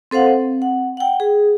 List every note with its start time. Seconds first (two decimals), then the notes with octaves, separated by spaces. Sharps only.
0.11 C4 A4 C5 F5 F#5
0.26 C4
0.62 F#5
0.97 F#5 G5
1.20 G#4